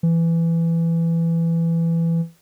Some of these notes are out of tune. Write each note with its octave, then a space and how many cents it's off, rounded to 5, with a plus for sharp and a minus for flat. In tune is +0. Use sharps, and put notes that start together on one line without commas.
E3 +15